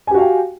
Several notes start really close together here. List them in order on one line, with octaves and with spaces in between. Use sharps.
G#5 G4 F#4 F5 G5